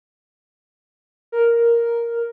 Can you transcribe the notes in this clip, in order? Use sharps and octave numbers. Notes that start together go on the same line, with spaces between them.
A#4